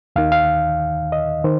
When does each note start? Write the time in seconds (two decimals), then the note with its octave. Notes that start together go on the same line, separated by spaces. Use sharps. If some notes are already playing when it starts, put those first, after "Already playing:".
0.16 D#2 D#3 F5
0.32 F5
1.12 D#5
1.44 D#3 C5